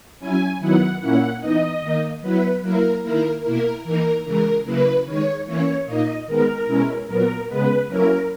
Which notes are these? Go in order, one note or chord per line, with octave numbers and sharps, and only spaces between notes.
F#3 C#4 E4 G#5
D#3 F#3 B3 E4 F#5
A#2 A#3 C#4 E4 F#5
E3 B3 D#4 D#5
D#3 A#3 D#4
F#3 B3 E4 B4
F#3 A#3 E4 A#4
D#3 A#3 E4 A#4
B2 A#3 E4 A#4
E3 A#3 D#4 A#4
C#3 E3 G#3 A#4
C#3 F#3 A#3 E4 B4
D#3 G#3 D#4 C#5
E3 A#3 C#4 E4 C#5
A#2 A#3 D#4 D#5
D#3 G#3 B3 D#4 A#4
B2 G#3 C#4 E4
A#2 F#3 B3 A#4
C#3 G#3 B3 B4
F#3 A#3 C#4 E4 A#4